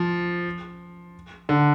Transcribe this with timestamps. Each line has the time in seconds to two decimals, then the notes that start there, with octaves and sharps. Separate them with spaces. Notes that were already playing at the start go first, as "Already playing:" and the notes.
Already playing: F3
1.49 D3